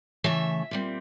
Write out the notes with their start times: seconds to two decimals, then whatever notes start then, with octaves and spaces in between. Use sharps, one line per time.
0.24 C#3 E3 A3 E5
0.71 A#2 G3 C4